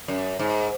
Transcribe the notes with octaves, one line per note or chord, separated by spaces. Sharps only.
F#2
G#2